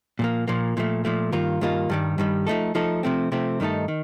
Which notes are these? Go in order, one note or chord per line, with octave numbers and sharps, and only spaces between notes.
A#2 F3 A#3
A#2 F3 A#3
A#2 F3 A3
A#2 F3 A3
G2 D#3 A#3 F4
G2 D#3 A#3 F4
G2 D#3 G3
G2 D#3 G3
F3 A3 D#4 A4
F3 A3 D#4 A4
C3 F3 A3 C4
C3 F3 A3 C4
G2 D#3 A3 D#4 A4
D#3